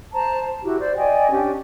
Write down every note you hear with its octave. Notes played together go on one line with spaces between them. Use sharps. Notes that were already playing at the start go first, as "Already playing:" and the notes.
C5 A5 A#5
E4 F#4 G4
C5 D5
D5 D#5 G5 G#5
C#4 D4 G4